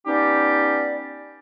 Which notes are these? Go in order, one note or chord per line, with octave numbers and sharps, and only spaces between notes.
B3 C#4 D#4 G4 D5